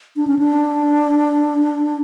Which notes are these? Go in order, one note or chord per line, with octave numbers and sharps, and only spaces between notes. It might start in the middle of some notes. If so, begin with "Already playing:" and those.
D4
C#4
D4